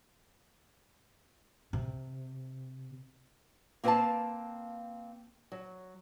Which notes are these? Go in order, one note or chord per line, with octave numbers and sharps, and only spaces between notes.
C3
A#3 C4 B4 C#5 F5 A5
F#3